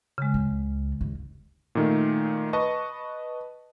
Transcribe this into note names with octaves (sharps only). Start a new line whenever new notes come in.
C#3 G#3
C#2
D#2
A#2 D#3 A3
B4 D#5 A5 C#6